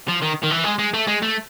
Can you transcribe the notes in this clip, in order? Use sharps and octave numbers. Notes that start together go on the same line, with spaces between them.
F3
D#3
D#3
E3
G#3
G#3
A3
G#3
A3